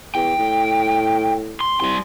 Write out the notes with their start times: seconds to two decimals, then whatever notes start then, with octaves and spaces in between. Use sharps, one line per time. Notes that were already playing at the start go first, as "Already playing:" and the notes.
0.15 E2 G5
0.39 A2
1.60 C6
1.80 C2 G3 C6